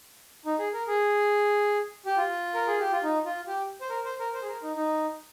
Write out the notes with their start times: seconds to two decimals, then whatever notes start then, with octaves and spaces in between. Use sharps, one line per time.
0.45 D#4
0.59 G#4
0.73 A#4
0.87 G#4
2.06 G4
2.17 F4
2.54 A#4
2.67 G#4
2.80 G4
2.92 F4
3.03 D#4
3.25 F4
3.47 G4
3.81 C5
3.90 A#4
4.04 C5
4.20 A#4
4.34 C5
4.42 G#4
4.48 A#4
4.63 D#4
4.76 D#4